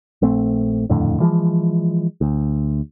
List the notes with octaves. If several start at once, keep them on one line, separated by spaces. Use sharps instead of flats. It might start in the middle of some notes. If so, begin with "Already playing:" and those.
A#1 A3 C4
D#1 F2 A2 D3
E3 F3 G#3
D2